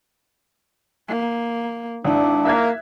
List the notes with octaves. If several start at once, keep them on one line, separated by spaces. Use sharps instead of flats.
A#3
G#1 D4 E4
A#3 E5 F#6 G#6